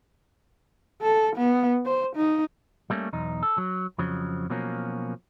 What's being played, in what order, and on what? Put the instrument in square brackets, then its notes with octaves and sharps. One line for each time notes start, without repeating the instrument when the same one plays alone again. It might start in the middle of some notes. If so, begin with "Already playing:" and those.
[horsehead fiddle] A4
B3
C5
D#4
[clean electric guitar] G3 A3 A#3 C4 C#4
B1 E2 D#4
A4
F#3
F2 C#3 F3 F#3
B2 F3 F#3 A#3 C#4